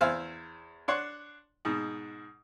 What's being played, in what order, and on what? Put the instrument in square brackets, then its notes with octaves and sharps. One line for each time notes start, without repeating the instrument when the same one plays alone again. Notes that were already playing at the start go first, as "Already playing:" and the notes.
[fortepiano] E2 C5 E5 F5 G#5
D4 C#5 F#5 C6
G#2 B2